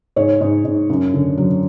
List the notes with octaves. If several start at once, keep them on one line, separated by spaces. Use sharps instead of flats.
G#2 C#5
G#2
G#2
F#2
D3
F#3